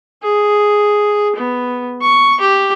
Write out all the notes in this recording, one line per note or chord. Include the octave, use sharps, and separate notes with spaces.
G#4
B3
C#6
G4